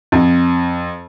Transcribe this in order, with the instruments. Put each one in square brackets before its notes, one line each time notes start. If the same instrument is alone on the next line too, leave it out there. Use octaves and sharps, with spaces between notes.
[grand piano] F2